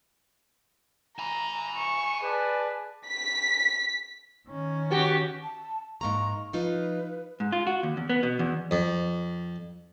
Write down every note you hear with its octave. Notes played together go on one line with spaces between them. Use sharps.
G#5 A#5 B5
C#6
G#4 B4 D5 A5
B6
D#3 C#4
B3 F#4 G4
A5
G#2 A#3 A#5 C#6
F3 D#4 F4 B4
G#2
F4
F#4
D#2
E2
B3
B2
E2
F2